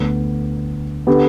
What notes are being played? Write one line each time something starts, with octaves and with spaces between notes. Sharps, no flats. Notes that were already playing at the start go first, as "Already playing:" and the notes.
Already playing: D2 D3 B3
D3 B3 G4